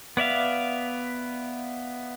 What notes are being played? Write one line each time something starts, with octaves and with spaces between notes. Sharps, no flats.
B3 D5 E5 F5